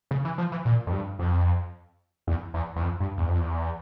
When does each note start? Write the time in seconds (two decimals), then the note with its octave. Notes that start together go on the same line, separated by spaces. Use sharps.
0.11 C#3
0.25 E3
0.38 F3
0.52 E3
0.65 A#2
0.87 F2
0.92 G2
1.19 F2
2.27 E2
2.54 E2
2.76 E2
2.82 F2
3.00 G2
3.18 E2
3.28 F2
3.39 E2